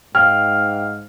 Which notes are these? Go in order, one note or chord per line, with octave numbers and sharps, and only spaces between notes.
G#2 F5 G5 F6